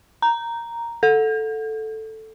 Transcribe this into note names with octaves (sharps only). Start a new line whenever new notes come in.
A#5
A4